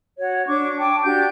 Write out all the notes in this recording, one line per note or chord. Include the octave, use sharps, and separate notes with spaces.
F#4 C#5
D4 C#6 D6
G5 A5 D6
D4 F#4 G4 G6